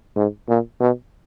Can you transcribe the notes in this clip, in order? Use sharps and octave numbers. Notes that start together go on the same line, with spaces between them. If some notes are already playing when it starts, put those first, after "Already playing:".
G#2
A#2
B2